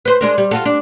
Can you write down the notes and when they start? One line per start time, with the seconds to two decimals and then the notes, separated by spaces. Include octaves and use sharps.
0.05 B4 C5
0.21 G#3 D4 A#4
0.38 G3
0.51 F4 F#4 A4
0.66 D4